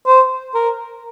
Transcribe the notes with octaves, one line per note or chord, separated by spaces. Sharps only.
C5
A#4